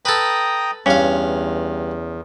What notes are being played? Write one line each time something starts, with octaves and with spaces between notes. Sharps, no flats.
A4 B4 G5 A#5 D#6
E2 G2 C#4 F5